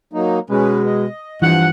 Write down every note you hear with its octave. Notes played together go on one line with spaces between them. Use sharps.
F#3 A#3 D#4
B2 G#3 C#4 B4
D#5
G2 E3 F3 F4 F#5